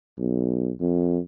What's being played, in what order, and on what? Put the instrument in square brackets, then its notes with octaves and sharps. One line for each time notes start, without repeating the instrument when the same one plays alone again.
[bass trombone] B1
F2